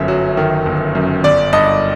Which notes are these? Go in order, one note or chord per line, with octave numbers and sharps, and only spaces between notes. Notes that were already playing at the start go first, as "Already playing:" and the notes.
Already playing: G1 F#2 E5
F#3
D#3
G1
F#2
G1 D5
G2 D#5